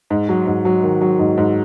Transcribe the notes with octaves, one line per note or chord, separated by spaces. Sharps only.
G#2
F#3
G#2
F#3
D#3
F#3
G#2
G#2